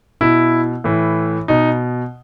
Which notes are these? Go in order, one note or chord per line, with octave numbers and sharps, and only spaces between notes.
B2 E4
A2 E3
B2 D#4